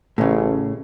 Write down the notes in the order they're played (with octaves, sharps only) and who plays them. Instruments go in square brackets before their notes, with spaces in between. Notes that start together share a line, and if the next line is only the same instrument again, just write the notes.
[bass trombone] A1 [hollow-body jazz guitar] A2 C#3